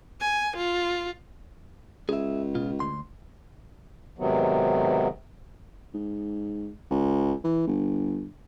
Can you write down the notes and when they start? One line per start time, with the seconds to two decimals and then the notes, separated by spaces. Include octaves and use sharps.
0.21 G#5
0.57 F4
2.09 C#2 G#4 E5
2.55 B2 F4
2.80 D2 C6
4.19 G#2 C3 D#3 F#3 B3
5.94 G#2
6.91 C#2
7.44 E3
7.67 G1